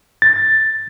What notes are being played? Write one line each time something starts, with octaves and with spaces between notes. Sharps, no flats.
A6